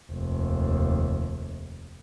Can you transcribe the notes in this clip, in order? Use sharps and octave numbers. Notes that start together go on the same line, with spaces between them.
F1 D#2